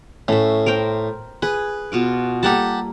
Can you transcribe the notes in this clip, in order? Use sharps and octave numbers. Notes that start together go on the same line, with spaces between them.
A2 C#4 E5
A#4 C5 G5
G#4 B4
B2 F4 D6
G3 A#3 G4 A4 F#5 A5